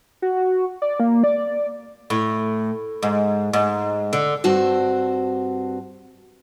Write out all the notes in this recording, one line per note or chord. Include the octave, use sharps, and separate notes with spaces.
F#4
D5
A#3
D5
A2
G#2
G#2
D3
G2 C4 F#4 A5